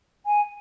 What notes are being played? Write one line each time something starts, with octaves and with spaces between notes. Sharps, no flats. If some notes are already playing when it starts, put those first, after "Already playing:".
G#5